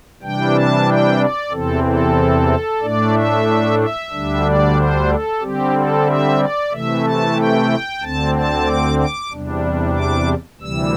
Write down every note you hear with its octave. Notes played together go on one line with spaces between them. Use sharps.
C3 E3 G3 D4 G5
A5
G5
D5
E2 C3 E3 C4 A4
A4
A2 A3 D4 D5
E5
E5
D2 D3 G3 D4
D5
C5
A4
D3 G3 C4 G4
A4
E5
D5
C3 E3 A3 E5
A5
G5
D2 D3 C4 A5
A5
D6
D6
E2 C3 G3 D4
D6
D2 C3 E3 G3 E6